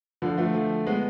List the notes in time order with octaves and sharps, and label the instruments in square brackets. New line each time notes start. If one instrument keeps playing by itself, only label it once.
[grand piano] D3 F3
F3 A3
F3 A3
G#3 B3